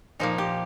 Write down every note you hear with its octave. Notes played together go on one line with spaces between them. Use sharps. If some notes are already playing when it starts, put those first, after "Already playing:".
A#2 F3 A#3 D#4
G4